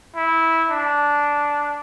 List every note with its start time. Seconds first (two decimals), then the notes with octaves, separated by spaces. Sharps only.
0.16 E4
0.70 D4